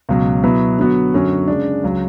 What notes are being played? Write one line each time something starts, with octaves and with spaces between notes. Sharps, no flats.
C#2 B2 F#3
B2 F#3 B3 E4 B4
D3 F#3 B3 F#4
F#2 D3 F#3 C#4 F#4
C#3 G#3 D4
C#2 C#3 F#3